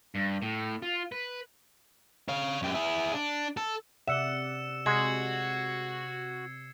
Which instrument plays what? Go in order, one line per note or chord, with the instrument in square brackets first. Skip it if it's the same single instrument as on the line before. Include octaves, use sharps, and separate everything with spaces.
[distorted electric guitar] G2
A2
F4
B4
C#5 F5
F#2 G4
E4 G#4
D4
A4
[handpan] C3 D5 F#5 [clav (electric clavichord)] E5 [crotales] E6 C#7 E7
[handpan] C3 [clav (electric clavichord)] G#3 [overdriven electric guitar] F#4 [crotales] G#6 C7 C#7